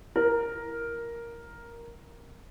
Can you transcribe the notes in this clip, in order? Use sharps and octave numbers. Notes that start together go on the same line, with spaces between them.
E4 A#4